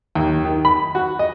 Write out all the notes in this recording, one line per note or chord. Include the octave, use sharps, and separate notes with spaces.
D#2
D#3
B5
F#4
D#5